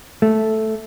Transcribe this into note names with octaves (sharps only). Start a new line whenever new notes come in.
A3